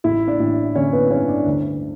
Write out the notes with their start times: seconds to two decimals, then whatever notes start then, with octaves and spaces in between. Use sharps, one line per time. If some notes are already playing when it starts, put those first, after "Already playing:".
0.04 A1 E4 E5
0.28 D4 D5
0.40 A1
0.75 D3 C#4 C#5
0.93 B3 B4
1.11 G2 C#4 C#5
1.29 D4 D5
1.46 D2